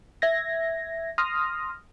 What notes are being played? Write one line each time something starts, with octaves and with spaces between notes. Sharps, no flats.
E5 G#6 A#6
C6 D#6 F6 A#6